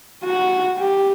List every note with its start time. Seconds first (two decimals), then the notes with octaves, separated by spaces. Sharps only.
0.24 F#4
0.77 G4